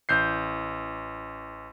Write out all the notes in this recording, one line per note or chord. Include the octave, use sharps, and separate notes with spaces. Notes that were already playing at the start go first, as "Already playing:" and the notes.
A1 G6 C7